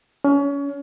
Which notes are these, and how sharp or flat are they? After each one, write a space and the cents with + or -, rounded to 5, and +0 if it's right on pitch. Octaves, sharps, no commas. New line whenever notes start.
C#4 +30